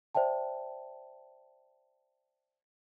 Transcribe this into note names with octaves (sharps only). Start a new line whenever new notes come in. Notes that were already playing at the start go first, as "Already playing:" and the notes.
C5 D5 E5 G5 A5